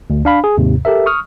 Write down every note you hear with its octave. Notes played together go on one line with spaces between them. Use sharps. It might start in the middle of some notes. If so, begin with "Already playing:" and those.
D2
D4 F5 B5
G#4
D#2 G#2 C3
G4 A4 A#4 E5
C#6 D#6 F6